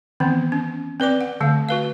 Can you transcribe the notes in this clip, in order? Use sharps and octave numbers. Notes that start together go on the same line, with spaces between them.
D#3 E3 B3 C4
C#4
C4 B4 D5 D6
F#5
D3 A3 F5
F#4 B4 F5